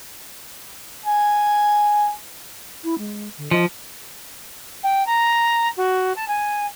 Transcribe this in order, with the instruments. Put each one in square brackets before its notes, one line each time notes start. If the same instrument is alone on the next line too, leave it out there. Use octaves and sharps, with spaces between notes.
[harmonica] G#5
[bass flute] E4
G#3
D3
[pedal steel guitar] F3 [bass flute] D#5
[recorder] G5
A#5
F#4
A5
G#5